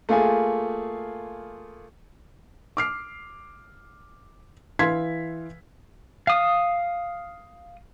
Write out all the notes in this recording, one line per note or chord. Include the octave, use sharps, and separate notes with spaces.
A3 A#3 F4 G#4 G#5
D6 F6 C7
E3 B4 F5 C6 G#6 B6
F5 D#6